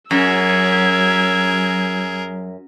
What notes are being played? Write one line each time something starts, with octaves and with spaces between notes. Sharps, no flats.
F#2 F#3 G#4 A#4 E6 G#6